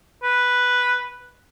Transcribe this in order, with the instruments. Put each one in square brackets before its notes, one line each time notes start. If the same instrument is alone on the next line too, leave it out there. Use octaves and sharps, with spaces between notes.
[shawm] B4